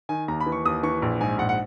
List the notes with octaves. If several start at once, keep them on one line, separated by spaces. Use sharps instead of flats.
D#3 G#5
D#2 A#5
B5
E3
C#6
D#2 D#6
E3 C#6
A#1
G#2 G#5
A#1 F#5
F#5